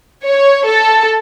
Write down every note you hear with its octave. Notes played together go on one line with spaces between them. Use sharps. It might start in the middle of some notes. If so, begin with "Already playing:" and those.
C#5
A4